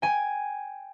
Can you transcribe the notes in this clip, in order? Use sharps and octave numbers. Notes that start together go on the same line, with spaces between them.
G5 G#5